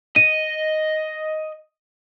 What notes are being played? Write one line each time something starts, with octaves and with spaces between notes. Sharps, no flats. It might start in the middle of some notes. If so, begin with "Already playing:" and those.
D#5 D#7